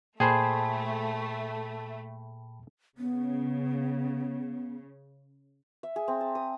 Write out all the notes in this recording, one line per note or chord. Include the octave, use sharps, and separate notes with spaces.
A#2 A3 G#4 C5 G5 A5 B5
C#3 B3
E5
G#4
C4
A5
D#6